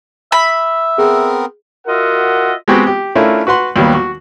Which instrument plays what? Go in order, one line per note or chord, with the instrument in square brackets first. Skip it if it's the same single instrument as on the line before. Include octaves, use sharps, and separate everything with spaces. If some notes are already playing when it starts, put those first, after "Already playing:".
[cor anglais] E5 [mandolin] B5
[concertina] B3 C4 A#4 [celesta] G#4
[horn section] F4 F#4 A#4 D#5 E5 F#5
[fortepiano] G#3 B3 C4 F#4 G4
G4
A3 C#4 D4 E4 F4 A#4
F#4 B4 F#5 C6
D#2 F#3 G3 B3
F#4